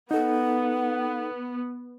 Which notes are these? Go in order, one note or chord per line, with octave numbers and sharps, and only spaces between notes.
B3 D#4 A4 F#5